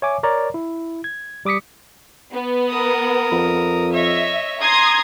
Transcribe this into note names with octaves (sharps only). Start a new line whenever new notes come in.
C#5 E5 G#5 D6
A#4 C#5 D5 A#5
E4
G#6
G3 D6 D#6 B6 C#7
B3
A#4 D#6
F2
C#5 D#5 E5
A#5 C6 D#6 G#6